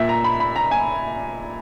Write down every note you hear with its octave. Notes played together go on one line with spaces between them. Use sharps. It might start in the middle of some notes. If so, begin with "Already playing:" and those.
Already playing: A#2 E5
A#5
B5
B5
A#5
G#5